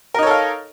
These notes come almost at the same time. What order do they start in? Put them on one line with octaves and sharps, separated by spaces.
A#4 D#4 C#5 A4 F5